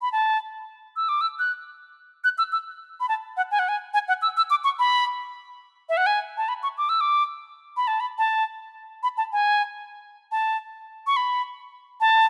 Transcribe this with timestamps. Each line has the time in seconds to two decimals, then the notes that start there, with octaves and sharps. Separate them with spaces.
0.02 B5
0.12 A5
0.96 E6
1.09 D6
1.21 E6
1.39 F#6
2.24 F#6
2.38 E6
2.52 E6
3.00 B5
3.09 A5
3.37 F#5
3.51 G#5
3.59 F#5
3.68 G#5
3.93 G#5
4.08 F#5
4.22 E6
4.37 E6
4.50 D6
4.64 C#6
4.79 B5
5.89 E5
5.97 F#5
6.06 G#5
6.37 A5
6.48 B5
6.63 C#6
6.78 D6
6.89 E6
7.01 D6
7.77 B5
7.87 A5
8.00 B5
8.18 A5
9.03 B5
9.17 A5
9.32 G#5
10.31 A5
11.07 C#6
11.16 B5
12.00 A5